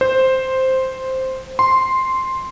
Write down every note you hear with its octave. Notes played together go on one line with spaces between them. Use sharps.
C5
C6